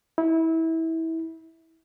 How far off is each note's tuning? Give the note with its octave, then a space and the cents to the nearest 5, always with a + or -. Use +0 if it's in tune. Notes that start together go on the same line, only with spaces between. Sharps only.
E4 -25